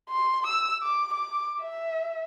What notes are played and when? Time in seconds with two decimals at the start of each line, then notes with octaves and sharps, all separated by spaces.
0.10 C6
0.47 E6
0.83 D6
1.14 D6
1.62 E5